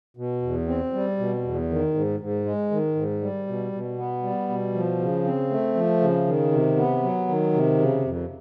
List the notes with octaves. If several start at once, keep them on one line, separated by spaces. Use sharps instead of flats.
B2
E2
C4
G3
B2
E2
D#3
G#2
G#2
G#3
D#3
G#2
G3
B2
B2
B3
G3
B2
F3
C#3
C4
A3
F3
C#3
D#3
C3
B3
F#3
D#3
C3
C#3
F2